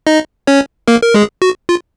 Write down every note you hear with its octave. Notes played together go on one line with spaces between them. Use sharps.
D#4 D#5
C#4 C#5
A#3 A#4
A#4
G#3 G#4
F#4
F4